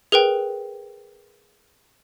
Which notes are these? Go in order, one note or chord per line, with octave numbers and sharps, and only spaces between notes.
G#4 A#4 B4 G5